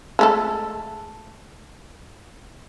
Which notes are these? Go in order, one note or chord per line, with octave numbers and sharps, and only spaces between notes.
G#3 A3 A4